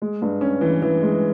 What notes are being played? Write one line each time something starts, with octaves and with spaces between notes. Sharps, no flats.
G#3
G2
C#4
E3
E3
G#3